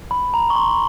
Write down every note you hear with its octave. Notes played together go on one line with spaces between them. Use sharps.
B5
A#5
C#6
C6